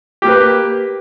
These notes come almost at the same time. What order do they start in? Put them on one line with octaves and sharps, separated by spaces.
G4 A#3 B4